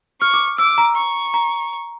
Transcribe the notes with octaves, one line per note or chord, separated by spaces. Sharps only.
C#6 F6
D6
D6 E6
A#5
C#6
A#5